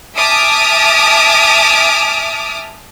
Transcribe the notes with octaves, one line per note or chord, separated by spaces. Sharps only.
E5 G#5 A5 D6 D#6 F6